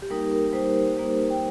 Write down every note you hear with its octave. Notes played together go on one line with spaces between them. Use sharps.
G4
G3 A#3 D#4 A#4
A#4
G3 A#3 D#4 C5
G3 A#3 D#4
G5